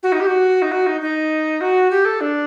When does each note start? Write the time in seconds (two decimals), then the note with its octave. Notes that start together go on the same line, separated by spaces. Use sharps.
0.03 F#4
0.12 D#4
0.20 G4
0.27 F#4
0.62 D#4
0.72 F#4
0.87 D#4
1.01 D#4
1.61 F#4
1.91 G4
2.05 A4
2.21 D4